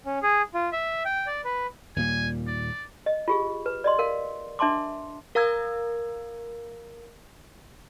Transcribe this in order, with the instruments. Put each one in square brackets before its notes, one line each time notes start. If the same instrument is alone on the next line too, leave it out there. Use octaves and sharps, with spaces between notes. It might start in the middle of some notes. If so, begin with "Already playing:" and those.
[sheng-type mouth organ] C#4
G#4
F4
E5
G5
D5
B4
[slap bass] D#2 A#2 G3 [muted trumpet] G#5
[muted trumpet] D5
[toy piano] D#5
F4 G4 G#4
B4
D5 D#5 C6
A#4 F5
D4 E5 A5 C6 D6
[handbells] A#4 F5 A#5 E6 G#6